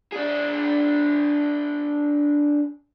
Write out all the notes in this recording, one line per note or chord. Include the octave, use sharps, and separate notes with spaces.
D4 G#4